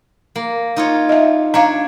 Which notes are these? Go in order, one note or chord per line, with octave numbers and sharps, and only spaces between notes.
A#3
D#4 F4 C#5
D#5 E5
D4 C#5 F5 A#5